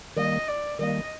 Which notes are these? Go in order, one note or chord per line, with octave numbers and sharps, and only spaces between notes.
D#3 G3 A#3 D#5
D5
D#3 G3 A#3 D#5